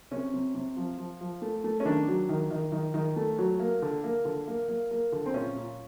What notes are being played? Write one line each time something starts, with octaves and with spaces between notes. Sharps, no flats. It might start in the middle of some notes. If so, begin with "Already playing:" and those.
C3 C#4
C3
C3
F3
F3
F3
A3
A3
C#4
D#3 D4
F#3
D#3
D#3
D#3
D#3
A3
F#3
A#3
D3
A#3
D3
A#3
A#3
A#3
D3
C4
A#2 C#4
A#2